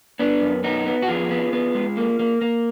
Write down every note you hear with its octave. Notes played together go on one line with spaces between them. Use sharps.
B3 D4
F#2
B3 D#4
B3
F#4
F2 F4 G#4
B3
B3
G#3
A#3
A#3
A#3